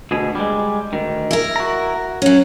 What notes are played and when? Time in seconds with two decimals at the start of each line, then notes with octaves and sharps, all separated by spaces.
0.11 D2 B2 G#4
0.35 G3 G#3
0.93 D2 D#3
1.31 E4 A#4
1.56 F#4 A#5
2.22 F#3 C#4